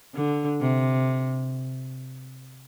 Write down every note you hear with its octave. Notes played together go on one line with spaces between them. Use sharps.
D3
C3